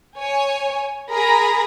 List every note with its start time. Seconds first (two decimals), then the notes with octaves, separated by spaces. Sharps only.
0.19 C#5 G#5
1.09 G#4 A#4 A#5 B5 A#6